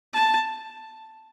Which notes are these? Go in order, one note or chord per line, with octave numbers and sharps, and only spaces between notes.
A5